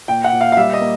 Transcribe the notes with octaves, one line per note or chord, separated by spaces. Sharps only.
A#2 G5
F#5
A#2
F5
F5
G3 E5
D#5
A#3